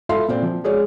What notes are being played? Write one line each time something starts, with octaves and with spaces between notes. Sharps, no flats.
E4 F4 A4 E5 F5 C6
A#2 C4 D5
F3
G#3 G#4 C#5 D5